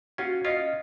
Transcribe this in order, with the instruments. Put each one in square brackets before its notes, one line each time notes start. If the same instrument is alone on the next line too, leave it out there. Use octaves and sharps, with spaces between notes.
[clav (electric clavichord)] C#4 F4 [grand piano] F#4
[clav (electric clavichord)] C#4 F4 [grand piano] D#5